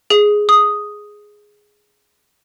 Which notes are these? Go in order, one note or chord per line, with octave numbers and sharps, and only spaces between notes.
G#4
D#6